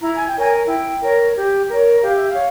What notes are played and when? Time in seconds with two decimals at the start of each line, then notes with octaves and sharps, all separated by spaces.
0.02 E4 A#5
0.14 G#5
0.27 G5
0.36 A#4 C#5 G#5
0.68 E4 G5
1.02 A#4 C#5
1.35 G4
1.69 A#4 C#5
2.01 G4 F5
2.16 E5
2.30 F5
2.35 C#5